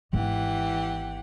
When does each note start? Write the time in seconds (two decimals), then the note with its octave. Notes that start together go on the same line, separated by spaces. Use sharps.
0.13 G#1 E3 B3 G4 F#5